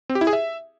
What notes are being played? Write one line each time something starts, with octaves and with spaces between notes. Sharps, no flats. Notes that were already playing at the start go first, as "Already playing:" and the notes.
C4
G4
E4
G#4
E5